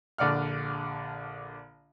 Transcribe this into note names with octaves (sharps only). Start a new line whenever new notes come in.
A#1 D3 D5 F#5 F6